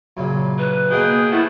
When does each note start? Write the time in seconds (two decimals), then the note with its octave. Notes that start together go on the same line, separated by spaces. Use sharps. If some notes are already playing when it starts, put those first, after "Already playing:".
0.17 F#2 A#2 C#3
0.59 B4
0.91 B2 A#3 G#4 G5
1.32 F3 A3 E4 F#5